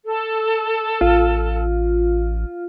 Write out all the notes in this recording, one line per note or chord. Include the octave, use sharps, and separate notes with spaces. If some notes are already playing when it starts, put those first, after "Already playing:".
A4
A1 F4